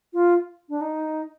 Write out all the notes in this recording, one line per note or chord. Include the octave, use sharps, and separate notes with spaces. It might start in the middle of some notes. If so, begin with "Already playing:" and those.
F4
D4
D#4